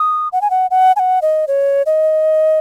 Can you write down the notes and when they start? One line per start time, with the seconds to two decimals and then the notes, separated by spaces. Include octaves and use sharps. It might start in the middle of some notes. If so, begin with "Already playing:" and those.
Already playing: D#6
0.32 F#5
0.42 G#5
0.50 F#5
0.71 F#5
0.96 G#5
0.99 F#5
1.22 D#5
1.48 C#5
1.86 D#5